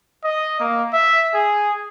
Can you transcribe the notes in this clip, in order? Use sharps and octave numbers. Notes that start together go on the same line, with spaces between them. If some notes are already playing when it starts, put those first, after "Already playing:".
D#5
A#3
E5
G#4